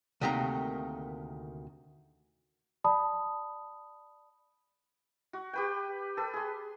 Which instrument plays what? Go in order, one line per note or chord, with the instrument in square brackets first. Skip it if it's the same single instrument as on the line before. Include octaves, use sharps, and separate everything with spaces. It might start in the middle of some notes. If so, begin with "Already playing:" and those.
[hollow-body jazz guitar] D2 C3 D#3 A3 A#3 A#5
[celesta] D5 A5 B5 D#6
[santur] F#4
G4 B4 G5
A4 B4
G#4 C6